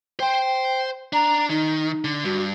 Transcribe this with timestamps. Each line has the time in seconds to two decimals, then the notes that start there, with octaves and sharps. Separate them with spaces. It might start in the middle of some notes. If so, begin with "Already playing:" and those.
0.20 C5 G5 C6
1.13 D4 A#5
1.50 D#3 D#4
2.04 D3
2.24 G2 F#4